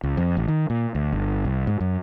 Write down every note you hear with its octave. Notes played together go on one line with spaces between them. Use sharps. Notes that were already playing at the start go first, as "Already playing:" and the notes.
C#2
F2
A1
D#3
A#2
D2
G1
C2
G#2
F#2